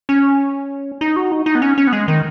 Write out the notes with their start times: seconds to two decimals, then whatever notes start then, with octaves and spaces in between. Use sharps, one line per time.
0.09 C#4
1.01 D#4
1.16 F#4
1.32 D#4
1.46 D#4
1.55 B3
1.62 C#4
1.78 C#4
1.87 B3
1.93 G#3
2.08 D#3